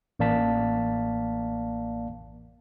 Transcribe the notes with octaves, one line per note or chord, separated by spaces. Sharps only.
A1 A#3 D5 F5 A5 B6